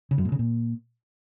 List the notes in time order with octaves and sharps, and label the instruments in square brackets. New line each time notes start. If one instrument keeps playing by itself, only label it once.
[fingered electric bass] C#3
F#2
A2
C#3
A#2